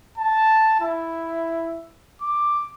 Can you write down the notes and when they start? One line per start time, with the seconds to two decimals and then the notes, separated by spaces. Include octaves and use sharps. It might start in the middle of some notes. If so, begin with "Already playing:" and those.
0.18 A5
0.81 E4
2.22 D6